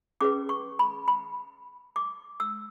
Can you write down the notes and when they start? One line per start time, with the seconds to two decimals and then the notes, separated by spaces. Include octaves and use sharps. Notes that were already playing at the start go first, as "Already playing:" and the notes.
0.21 C#4 G#4 B4 D6
0.49 C#6
0.79 B5
1.08 B5
1.96 D6
2.40 E6